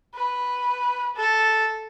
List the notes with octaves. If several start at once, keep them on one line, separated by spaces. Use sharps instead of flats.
B4
A4